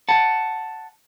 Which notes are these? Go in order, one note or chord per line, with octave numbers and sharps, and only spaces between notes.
F#5 A5